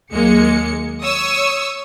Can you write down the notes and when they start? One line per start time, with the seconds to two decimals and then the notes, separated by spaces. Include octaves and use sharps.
0.12 D#2 F#3 G#3 A#3 C#7
1.02 C#5 C#6 D#6 E6